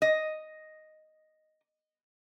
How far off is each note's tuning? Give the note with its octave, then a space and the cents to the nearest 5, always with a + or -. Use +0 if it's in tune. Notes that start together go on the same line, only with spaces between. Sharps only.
D#5 +0